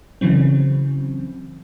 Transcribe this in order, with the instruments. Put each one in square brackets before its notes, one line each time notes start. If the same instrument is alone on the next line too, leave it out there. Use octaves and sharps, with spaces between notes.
[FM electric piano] C#3 E3 F#3 C4